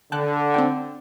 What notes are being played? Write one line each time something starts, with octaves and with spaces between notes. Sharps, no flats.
D3 G5 A5 F#6
C4 D4 G5